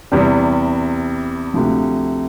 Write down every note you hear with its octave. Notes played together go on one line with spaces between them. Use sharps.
E2 C3 G3
D2 C3 F3